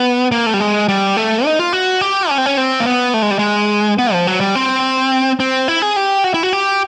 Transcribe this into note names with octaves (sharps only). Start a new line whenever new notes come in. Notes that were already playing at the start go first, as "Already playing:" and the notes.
Already playing: B3
A#3
A3
G3
G#3
G3
A3
D#4
F4
F#4
G4
C#4
C4
C#4
C4
A#3
B3
A3
G#3
G3
G#3
B3
F3
F#3
G3
C4
C4
E4
G#4
G4
F#4
E4
F#4
G4